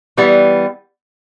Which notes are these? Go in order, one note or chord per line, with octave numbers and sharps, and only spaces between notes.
E3 G3 B3